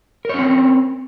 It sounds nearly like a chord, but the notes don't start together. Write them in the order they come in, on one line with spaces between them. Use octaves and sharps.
A#4 C#5 C#4 C4